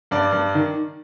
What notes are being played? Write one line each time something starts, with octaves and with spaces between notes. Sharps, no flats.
G2 D5
G2
D#3